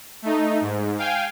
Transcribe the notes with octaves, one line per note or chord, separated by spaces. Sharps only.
A3 D#4
G#2
F5 G5 G#5